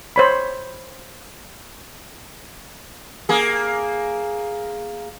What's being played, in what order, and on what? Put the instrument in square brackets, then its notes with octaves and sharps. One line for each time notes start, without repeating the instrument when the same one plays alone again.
[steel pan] C5 C#5 B5
[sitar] A#3 G#4